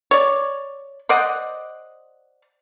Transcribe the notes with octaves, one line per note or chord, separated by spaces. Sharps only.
C#5 D5
C5 D5 D#5 F#5